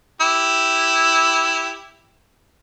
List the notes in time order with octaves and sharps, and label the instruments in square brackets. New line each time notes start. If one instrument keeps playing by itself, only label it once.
[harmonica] E4 G4